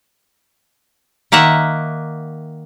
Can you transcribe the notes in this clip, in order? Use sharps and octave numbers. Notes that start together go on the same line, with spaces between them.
D#3 A#3 E5 F#5